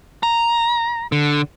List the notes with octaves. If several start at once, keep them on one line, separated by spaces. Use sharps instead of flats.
A#5
D3